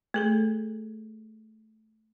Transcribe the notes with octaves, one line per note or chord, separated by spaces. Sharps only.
A3 G#4 A4